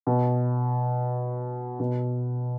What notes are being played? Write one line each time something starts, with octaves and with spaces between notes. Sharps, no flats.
B2
B2